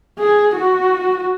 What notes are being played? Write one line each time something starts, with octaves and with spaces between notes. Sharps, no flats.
G#4
F#4